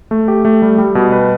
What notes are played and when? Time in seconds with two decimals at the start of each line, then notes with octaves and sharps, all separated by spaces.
0.11 A3
0.28 G4
0.45 A3
0.62 G3
0.78 G3
0.95 B2
1.12 B4